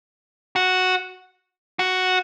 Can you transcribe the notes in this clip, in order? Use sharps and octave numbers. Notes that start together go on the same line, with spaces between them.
F#4
F#4